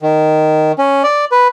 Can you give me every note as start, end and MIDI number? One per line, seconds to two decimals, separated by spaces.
0.02 0.72 51
0.79 1.03 61
1.04 1.25 74
1.32 1.48 71